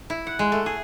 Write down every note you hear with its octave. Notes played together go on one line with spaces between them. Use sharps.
E4
F#5
G#3
A3
G#4